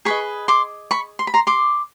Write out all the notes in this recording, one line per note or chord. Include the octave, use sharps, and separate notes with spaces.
G#4 B4 D#5 B5 C#6
C6 D6
B5 C#6
C6
B5
A#5 C6
C6 D6